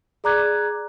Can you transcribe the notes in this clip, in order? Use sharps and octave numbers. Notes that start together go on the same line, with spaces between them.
G#4 D5 A#5 D6 F#6 G#6